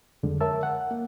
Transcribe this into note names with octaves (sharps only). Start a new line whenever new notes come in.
F2 D3 G#3
A#4 C#5 E5 A5 E6
F#5
A#3